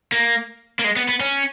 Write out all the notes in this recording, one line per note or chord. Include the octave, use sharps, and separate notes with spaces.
A#3
A#3
G#3
B3
B3
C#4